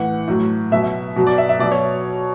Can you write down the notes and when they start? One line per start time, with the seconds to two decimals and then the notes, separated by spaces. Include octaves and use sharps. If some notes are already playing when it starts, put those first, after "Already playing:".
Already playing: A2 E3 F#5
0.28 A2 F#3
0.71 B2 F#3 E5
1.16 B2 F#3
1.27 D5
1.38 E5
1.49 E5
1.59 B2 F#3 D5
1.71 C#5